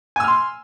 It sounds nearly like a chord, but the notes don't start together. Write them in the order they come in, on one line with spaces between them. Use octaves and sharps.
G#5 E6 F6 C6